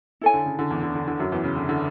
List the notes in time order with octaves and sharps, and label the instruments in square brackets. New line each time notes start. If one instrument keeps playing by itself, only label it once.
[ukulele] E4 A4 C#5 G#5
[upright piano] D3
C#3
D3
E2 E3
D3
D3
D3
F#2 F#3
E2 E3
C#3
D3
D3